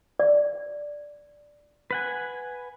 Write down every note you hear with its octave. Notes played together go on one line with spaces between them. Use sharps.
D5
B4 F#5 G#5